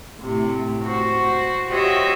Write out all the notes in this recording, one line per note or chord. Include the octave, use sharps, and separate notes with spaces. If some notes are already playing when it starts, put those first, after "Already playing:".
A2 C3
F#4 C5
F#4 G4 C5 C#5 D#5 E5